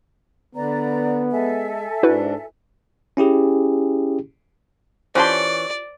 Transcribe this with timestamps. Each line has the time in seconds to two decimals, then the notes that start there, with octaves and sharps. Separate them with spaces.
0.55 D3 B3 B4 D5 A#5
1.31 G#3 A4 E5 G#5
2.03 G#2 D4 E4 F#4 B4
3.17 C#4 E4 G4 G#4
5.15 E3 C#4 F4 G4 C5 D5 A5 C6